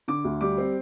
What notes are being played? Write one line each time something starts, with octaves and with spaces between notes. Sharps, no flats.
D3 D6
D2
G3 D6
C4